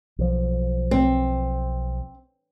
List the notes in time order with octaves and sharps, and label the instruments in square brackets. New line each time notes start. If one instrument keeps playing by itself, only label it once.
[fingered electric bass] B1 F3
[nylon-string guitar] C4